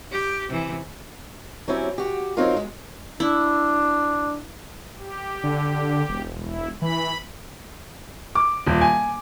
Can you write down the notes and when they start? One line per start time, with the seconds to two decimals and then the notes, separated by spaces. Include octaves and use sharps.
0.12 G4
0.49 C3 E3
1.68 F#3 C4 C#4 E4 G4
1.98 F#4 G4
2.37 F#3 C4 D#4 F4 A#4
2.57 G#3
3.20 D4 E4
4.98 G4
5.44 D3
6.09 E1
6.42 E4
6.82 E3 B5
8.35 D6
8.67 D#1
8.81 G#5